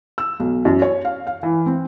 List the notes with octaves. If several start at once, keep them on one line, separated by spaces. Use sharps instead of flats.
E6
B1
F#2
C#5
F5
F5
E3
C4